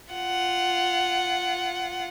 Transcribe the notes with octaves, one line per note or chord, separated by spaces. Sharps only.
F4 F#5